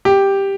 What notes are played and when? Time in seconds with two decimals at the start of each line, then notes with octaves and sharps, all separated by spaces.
0.05 G4